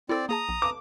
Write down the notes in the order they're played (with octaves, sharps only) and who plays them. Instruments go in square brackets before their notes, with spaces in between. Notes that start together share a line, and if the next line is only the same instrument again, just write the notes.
[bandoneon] C4 D5 [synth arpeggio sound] E4 A4
[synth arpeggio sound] A#3 G#4 A5 [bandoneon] A#5 D#6
[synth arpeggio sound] A#1
[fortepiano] D6 [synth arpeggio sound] E7